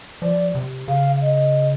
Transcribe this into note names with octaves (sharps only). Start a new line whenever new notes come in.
F3 D5
C3
C#3 F5
D#5